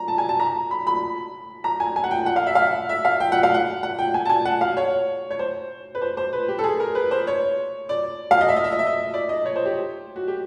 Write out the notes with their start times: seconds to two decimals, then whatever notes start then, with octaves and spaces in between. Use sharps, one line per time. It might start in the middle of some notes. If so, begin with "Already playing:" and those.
Already playing: A#5
0.08 A5
0.18 G#5
0.29 A5
0.40 A#5
0.71 B5
0.87 B5
1.64 A#5
1.80 G#5
1.96 G#5
2.04 F#5
2.11 G5
2.26 F#5
2.36 F5
2.47 E5
2.55 F5
2.89 E5
3.05 F5
3.20 G5
3.32 F#5
3.43 F5
3.54 F#5
3.83 F#5
3.99 G5
4.14 G#5
4.25 A5
4.30 G#5
4.45 F#5
4.61 F5
4.77 C#5
5.31 C#5
5.39 C5
5.95 B4
6.02 C5
6.17 C5
6.33 B4
6.48 G4
6.59 A4
6.64 G#4
6.80 A#4
6.95 B4
7.11 C5
7.27 C#5
7.89 D5
8.31 F5
8.41 D#5
8.49 E5
8.57 D#5
8.64 E5
8.72 D#5
8.79 E5
8.86 D#5
9.14 D5
9.29 D#5
9.46 C#5
9.56 C5
9.65 G4
10.16 F#4
10.28 G4